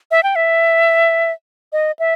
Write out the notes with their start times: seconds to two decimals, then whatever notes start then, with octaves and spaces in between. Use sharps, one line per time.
0.11 E5
0.23 G5
0.36 E5
1.73 D#5
1.99 E5